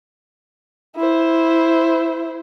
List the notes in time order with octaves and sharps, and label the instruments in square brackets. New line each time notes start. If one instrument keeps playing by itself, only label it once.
[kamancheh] E4 C5